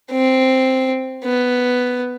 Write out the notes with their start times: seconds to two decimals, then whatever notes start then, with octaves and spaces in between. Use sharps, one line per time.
0.11 C4
1.24 B3